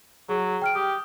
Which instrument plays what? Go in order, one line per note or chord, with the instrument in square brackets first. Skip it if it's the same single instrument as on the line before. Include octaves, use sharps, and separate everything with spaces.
[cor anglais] F#3 [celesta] G#4
[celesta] G5 F6 D7
[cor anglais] G4 [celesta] D#6